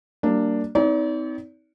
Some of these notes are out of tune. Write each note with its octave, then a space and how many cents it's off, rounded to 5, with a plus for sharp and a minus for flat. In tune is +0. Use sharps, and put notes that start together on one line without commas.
G3 -40 A#3 -20 D4 +0
C4 -30 D#4 +25 D5 -40